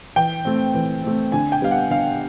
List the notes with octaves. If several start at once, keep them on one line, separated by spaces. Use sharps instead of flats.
E3 G5
A3 C4
E3
A3 C4
D3 G#5
G5
G3 B3 F5
F#5
D3 F5